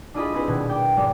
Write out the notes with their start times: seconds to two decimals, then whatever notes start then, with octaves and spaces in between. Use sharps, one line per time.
0.14 D4 E4 F4 G#4 D#5 B5
0.34 C4 E4 G#4 B4 C5
0.47 D#1 B2 G#6
0.69 D5 G5
0.97 G#1 G#3 D5